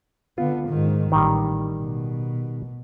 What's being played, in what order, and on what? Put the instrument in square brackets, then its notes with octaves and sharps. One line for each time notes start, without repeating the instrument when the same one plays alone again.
[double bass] D3 B3 [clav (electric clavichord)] F4
[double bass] G#2 D#3
[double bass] A1 [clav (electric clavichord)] D#3 G3
[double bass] B2